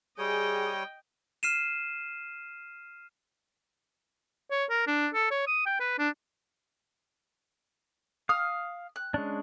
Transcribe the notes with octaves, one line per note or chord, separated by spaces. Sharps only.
G3 G#4 C#5 D#5 G5 D#6
F6 C7 D#7 E7
C#5
A#4
D4
A4
C#5
D#6
G5
B4
D4
F5 D#6 F6
F#6
G#3 C#4 D4